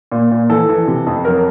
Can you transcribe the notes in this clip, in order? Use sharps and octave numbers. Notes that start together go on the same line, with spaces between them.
A#2
A#2
E3 A4
E3
C3
F2
F#3 A#4